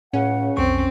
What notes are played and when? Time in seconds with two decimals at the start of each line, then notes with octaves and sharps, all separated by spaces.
0.13 C#2 A2 C#3 C#4 F#5
0.57 B1 F2 C4 C#6